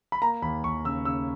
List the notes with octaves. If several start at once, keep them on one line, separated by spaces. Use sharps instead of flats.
B5
A#3 A#5
D#2 B5
D#2 C#6
C#3 E6
C#3 E6